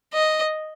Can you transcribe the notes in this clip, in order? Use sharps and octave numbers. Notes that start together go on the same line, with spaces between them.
D#5